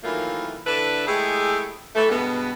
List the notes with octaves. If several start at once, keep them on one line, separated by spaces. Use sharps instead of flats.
D#3 E3 F#3 A3 A#3 F4
D3 D4 E4 A4 B4
G#3 A3 E4 G4 G#4
E3 A3
G2 B2 G#3 B3